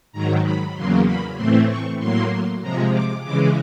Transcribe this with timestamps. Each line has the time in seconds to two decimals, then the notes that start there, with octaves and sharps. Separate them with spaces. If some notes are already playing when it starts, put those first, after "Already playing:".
0.12 G#2 D#3 F#3 A#5
0.43 B5
0.75 E2 C#3 F#3 A#3 C6
1.06 B5
1.36 A2 E3 A3 C4 C6
1.68 C#6
1.99 A2 F#3 A#3 C6
2.61 C3 F3 G#3 A#5
2.93 D6
3.23 C#3 E3 G#3 D6